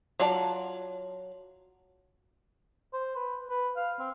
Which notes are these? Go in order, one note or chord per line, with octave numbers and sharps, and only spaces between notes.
F#3 F4 D5 A5
C5
B4
B4
F5
C4